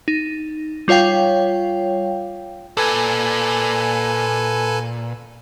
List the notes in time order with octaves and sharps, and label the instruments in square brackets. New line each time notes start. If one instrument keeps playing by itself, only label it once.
[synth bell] D#4
G3 F4 C#5 F5 G5
[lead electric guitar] A#2 [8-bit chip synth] A4 B4 G#5